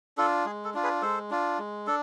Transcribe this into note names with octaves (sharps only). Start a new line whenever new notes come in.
D4 F4 A4
G#3 G#4
A4
D4 F4
G#4 B4
G#3 A4 C5
D4 F4
G#3
D4 A4